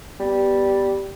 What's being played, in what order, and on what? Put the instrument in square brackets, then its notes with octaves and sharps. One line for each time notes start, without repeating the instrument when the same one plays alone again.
[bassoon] G3 [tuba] B3